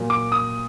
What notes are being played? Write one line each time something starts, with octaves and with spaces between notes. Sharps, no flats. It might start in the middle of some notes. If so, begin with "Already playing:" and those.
Already playing: A#2 F#3 A#3
D6
D#6